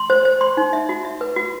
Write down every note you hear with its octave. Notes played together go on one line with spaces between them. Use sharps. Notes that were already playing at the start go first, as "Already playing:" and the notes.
Already playing: C6
C5
C5
C6
D#4
E5
F#4
E5
B4
F#4